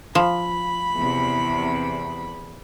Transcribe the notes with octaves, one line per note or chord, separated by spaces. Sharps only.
F3 B5
E2 C3